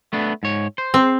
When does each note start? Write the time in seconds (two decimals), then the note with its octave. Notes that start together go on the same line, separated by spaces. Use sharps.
0.13 A3 B3 D4
0.43 G#2 C#5
0.78 C5
0.94 C4